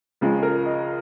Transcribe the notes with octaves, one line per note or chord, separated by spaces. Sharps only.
C#2 C#3 F3 G#3
A#4
D#5